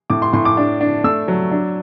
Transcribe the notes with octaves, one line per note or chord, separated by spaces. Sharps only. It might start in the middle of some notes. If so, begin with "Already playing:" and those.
A2 D6
C6
A2 C6
D6
D4
D4
A3 E6
F#3
D4